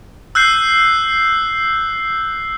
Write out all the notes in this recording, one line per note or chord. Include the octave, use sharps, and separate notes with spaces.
E6 F#6 G6 C7